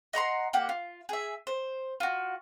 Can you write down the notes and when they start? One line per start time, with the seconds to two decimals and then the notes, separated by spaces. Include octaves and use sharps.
0.13 D#5 F#5 A#5 C6
0.53 A#3 G4 F#5
0.69 F4
1.09 G#4 E5
1.47 C5
2.00 F4 F#4